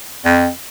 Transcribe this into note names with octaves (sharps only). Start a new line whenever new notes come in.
F2